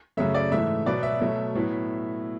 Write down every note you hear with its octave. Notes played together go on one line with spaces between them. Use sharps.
F#2 C#3 F#3 A3 E5
D5
G#2 E3 A3 E5
B2 F#3 B3 D5
E5
B2 F#3 A3
A2 F#3 B3